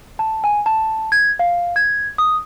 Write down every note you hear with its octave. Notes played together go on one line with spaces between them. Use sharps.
A5
G#5
A5
G#6
F5
G#6
D#6